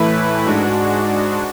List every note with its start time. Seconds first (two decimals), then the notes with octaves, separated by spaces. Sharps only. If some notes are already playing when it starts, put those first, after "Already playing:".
Already playing: A2 E3 A3 E4 B4
0.46 G#2 G#3 D4 F#4